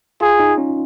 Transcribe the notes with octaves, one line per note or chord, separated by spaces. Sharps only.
F4 G#4
D#4
C#4